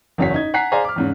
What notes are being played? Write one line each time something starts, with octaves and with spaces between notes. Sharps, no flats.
F#1 E2 C#4 F#4 B6
D#4 G#6
F#5 G#5 A#5 F#6 B6 C7
G#4 C5 D5 F5 G#5 A#5
D6 F6
E2 G#2 C#3